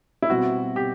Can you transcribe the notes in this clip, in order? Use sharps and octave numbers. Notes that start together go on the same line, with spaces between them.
E4
B2 G3 C4 F#4
G4